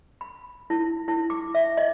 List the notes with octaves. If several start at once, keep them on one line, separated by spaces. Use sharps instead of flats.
B5
E4
E4
D6
E5
D#5